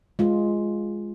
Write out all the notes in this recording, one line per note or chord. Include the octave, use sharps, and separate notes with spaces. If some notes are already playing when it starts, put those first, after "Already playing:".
G#3 F4